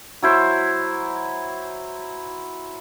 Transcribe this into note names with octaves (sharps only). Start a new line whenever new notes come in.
F#3 E4 C5